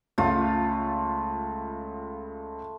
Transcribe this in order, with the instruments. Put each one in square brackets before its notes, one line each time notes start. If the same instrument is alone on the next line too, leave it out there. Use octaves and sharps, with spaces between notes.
[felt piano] C#2 C#3 [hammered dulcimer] A3 F4